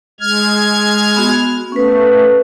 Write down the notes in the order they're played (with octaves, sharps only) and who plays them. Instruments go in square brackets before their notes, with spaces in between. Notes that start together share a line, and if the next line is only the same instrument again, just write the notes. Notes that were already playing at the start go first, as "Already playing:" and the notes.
[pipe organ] G#3 F6 G#6
[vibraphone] B3 F#4
[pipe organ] A3 [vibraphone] C#4 B4